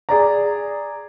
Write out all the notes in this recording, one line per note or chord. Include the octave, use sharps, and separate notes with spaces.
G#4 D5 A#5